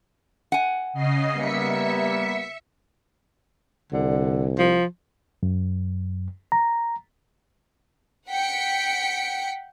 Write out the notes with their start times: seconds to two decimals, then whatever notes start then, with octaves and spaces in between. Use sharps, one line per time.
0.52 F#5 G#5
0.93 C#3 D#5 C7
1.36 G3 A#3 B3 E5 B6 C#7
3.92 C2 D3
4.59 F3
5.43 F#2
6.52 A#5
8.28 F#5 G5 B6 C#7 D7